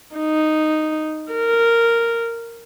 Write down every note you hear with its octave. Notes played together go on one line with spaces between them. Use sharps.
D#4
A#4